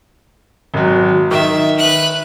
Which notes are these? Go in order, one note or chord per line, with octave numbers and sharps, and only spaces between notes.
G#1 F#3
D#3 E5
B4 F#6